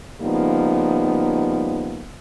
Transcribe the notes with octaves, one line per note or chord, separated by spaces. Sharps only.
C#3 F3 G3 A#3 B3 D#4